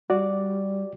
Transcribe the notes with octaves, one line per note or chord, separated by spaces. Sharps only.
G3 F#4 D5